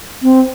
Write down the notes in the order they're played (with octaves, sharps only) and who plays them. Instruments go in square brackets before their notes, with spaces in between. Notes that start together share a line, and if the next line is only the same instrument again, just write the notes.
[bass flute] C4